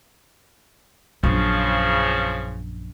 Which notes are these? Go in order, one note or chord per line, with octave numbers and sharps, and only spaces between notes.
A#1 F#2 C#3 F3